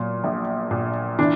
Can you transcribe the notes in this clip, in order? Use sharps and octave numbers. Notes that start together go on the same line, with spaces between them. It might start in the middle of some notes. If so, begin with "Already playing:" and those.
Already playing: A#2 F#3
A#1
A#2
E3 D4